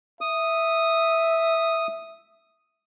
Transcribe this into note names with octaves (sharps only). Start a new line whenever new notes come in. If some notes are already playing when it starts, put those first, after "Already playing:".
E5 D#6